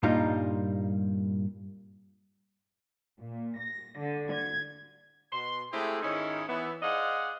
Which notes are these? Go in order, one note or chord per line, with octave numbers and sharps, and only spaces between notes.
G2 A#2 G3 D#4 F4
A#2
A#6
D3
G#6
B2 C6
G#3 A3 C4 E4 G4 G#4
G#2 D#3 C#4 D#4 E4
E3 B3 E5
G#4 C5 D5 D#5 F5 F#5